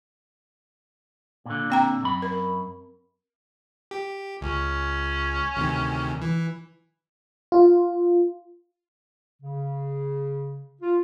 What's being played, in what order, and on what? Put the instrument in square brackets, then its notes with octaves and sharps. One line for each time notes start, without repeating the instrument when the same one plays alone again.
[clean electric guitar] A#2 D3
[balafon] C4 G5 A#5
[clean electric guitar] F#2 B5
[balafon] A#4
[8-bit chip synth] G4
[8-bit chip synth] C#2 [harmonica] C#4
[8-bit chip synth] D2 C3 D#3
E3
[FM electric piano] F4
[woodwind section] C#3
F4